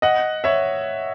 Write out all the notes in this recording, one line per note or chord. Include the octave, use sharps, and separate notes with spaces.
D#5 F#5
C#5 E5